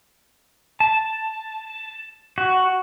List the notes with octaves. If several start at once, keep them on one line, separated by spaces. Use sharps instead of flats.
A5
F#4